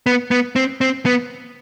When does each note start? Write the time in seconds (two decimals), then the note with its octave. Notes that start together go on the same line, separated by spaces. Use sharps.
0.06 B3
0.31 B3
0.56 C4
0.81 C4
1.06 B3